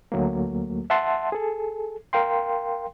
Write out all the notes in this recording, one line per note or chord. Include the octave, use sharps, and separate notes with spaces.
D2 F#3 A3 A#3
E5 F#5 A5 C6
G#4 A4
A#4 F5 G5 C6